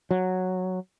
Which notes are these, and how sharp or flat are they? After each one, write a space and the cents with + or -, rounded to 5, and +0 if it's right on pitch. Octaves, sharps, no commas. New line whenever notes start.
F#3 -5